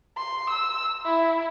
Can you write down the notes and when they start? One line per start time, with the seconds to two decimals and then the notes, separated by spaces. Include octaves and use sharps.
0.17 C6
0.50 E6
1.05 E4